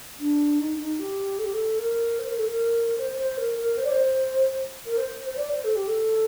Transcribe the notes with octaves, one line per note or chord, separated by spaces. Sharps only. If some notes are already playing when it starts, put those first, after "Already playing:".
D4
D#4
D#4
G4
A4
G4
A4
A#4
C5
A#4
A4
A#4
C5
C5
A#4
A#4
C5
D5
C5
A#4
C5
C5
D5
C5
A4
G4
A4